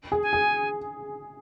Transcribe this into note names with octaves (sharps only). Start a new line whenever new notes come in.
G#4
G#5
G#4